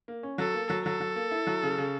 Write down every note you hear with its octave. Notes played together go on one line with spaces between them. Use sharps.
A#3
C#4
F#3 A4
A#3
F#3
F#3 A4
F#3
A#3
E4
F#3
C#3
C#3